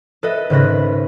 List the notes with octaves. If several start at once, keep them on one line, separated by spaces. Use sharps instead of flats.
A4 B4 D#5 E5
G#1 C#3 B4 A#6